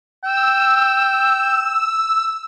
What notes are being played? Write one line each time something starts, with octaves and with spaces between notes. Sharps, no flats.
G5 E6